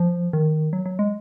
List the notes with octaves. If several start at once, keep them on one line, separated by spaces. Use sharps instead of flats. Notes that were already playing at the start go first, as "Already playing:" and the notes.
Already playing: F3
D#3
F#3
F#3
G#3